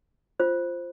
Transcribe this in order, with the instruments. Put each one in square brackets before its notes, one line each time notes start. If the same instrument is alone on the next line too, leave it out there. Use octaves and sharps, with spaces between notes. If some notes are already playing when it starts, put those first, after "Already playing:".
[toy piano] F4 C5